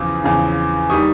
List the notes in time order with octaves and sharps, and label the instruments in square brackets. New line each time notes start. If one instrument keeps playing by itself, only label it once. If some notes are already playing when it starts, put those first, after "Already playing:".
Already playing: [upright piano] E2 C#3 F3
E2 C#3 F3
D#3 G3 C#6 D#6